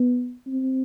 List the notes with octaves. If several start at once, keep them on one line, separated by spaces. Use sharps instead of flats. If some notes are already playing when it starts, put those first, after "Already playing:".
Already playing: B3
C4